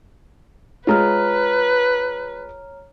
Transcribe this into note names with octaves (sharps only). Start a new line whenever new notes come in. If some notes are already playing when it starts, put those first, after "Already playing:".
G#3 F4 B4 C#5 A#5 F6